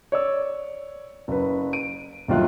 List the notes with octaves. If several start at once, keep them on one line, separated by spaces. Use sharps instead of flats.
C#5 D5 E6
F#1 B4
D7 D#7
G1 D#2 F#3 F4 E5 F#6